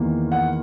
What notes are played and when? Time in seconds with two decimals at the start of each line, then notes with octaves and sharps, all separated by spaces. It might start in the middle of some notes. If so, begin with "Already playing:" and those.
Already playing: E2 D#3 A#3
0.32 F#5